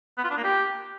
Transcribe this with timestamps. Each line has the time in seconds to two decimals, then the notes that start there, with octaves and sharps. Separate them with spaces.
0.18 B3
0.24 F4
0.31 D4
0.37 A#3
0.44 G4